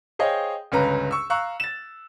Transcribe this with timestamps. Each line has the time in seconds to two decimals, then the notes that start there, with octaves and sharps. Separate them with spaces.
0.19 G#4 C5 C#5 D#5 F5 G5
0.72 G1 C#2 C#4 B4 A#5
1.11 C#6 E6
1.30 F5 A#5 C#6 E6 F#6
1.60 A6 E7